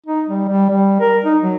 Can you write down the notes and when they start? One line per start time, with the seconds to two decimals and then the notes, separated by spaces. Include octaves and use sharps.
0.07 D#4
0.27 G3
0.48 G3
0.70 G3
1.00 A#4
1.25 D#4
1.42 F#3